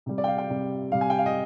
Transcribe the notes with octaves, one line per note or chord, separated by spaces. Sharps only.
C3 G3
D5
G5
F5
G5
C3 G3
C3 G3 F5
G#5
G5
F5
D#5